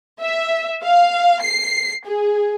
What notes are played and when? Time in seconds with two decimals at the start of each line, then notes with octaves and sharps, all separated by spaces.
0.22 E5
0.84 F5
1.42 C7
2.06 G#4